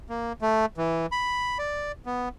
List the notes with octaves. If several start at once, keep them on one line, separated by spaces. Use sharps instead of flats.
A#3
A3
E3
B5
D5
B3